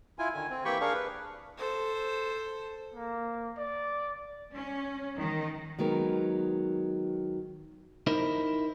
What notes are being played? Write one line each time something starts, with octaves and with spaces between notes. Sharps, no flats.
E4 F4 G#5
D3 D#3 G#5
C4
E3 A#3 G4 G5 B5 C#6
D4 G#4 A#4 F5 C#6
B4
A4 C5
A#3
D5
C#4
D#3
D#3 F#3 G#3 B3 A#4
D#4 E4 A#4 C5 D#5